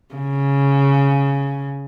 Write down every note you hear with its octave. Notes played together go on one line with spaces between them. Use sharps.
C#3